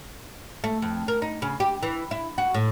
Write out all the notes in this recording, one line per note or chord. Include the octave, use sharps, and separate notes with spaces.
A3
F2
A#4
D#4
C#3
G4
E3
E4
F#4
A2